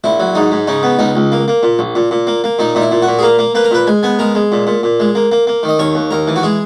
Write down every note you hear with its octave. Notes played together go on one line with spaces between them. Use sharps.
A#1 E4
F#3
G#2 D#4
G#2
C#3 D#4
B3
C#2 D#4
C#2
A#3
A#3
A#2
A#1
A#2
A#2
A#3
A#3
A#2 D#4
A#2 D#4
E4
A#2
F#4
A#2
G#4
A#3 A#4
A#3
A#3 B4
A#4
A#2 B4
G#3 G#5
B3 G#5
G#3 A#4
G#3
A#2
A#2
A#2
G#3
A#3
A#3
A#3
D#3
D#5
D#2 C#5
D#2
D#2 A#4
E3
F#4
G#3 G#4